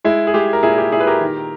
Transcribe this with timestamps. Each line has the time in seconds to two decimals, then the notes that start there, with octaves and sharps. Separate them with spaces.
0.04 G#3 E4
0.27 G#4
0.34 G#3 G4
0.53 A#4
0.63 A#2 E4 G#4
0.78 G4
0.92 A#2 E4 G#4
1.00 B4
1.07 G4 A#4
1.21 D#3